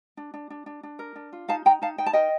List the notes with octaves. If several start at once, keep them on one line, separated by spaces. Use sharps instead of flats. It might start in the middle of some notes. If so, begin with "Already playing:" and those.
D4
D4
D4
D4
D4
A#4
D4
F4
D#4 F5 A5
D#4 G5 A#5
D#4 F5 A5
D#4 G5
A5
A#4 D#5 G5